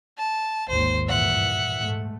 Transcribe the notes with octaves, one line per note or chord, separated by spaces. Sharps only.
A5
G#1 D#2 C5
G2 A#2 E3 E5 F#5
G#2 A3